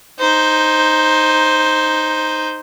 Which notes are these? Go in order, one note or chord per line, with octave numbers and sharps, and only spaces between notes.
D#4 C5